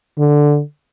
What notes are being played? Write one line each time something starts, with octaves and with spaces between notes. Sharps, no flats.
D3